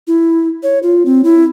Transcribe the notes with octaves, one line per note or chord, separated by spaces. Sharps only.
E4
C#5
F4
C4
E4